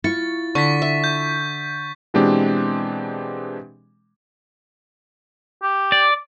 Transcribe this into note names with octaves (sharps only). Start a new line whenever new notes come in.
E4 F4 C#6 A6
D3 C#6 B6
E5
G6
B2 E3 G#3 C4 D4 G4
G4
D5